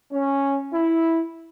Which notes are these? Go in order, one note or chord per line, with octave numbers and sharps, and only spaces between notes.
C#4
E4